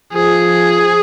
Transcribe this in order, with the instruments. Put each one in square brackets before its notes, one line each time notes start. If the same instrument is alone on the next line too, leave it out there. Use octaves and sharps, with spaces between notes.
[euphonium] F3 [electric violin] G#4